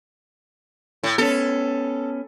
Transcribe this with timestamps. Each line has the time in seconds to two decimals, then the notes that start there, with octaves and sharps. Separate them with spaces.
1.03 A2
1.18 B3 C#4 A4